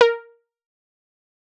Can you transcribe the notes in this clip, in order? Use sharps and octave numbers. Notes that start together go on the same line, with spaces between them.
A#4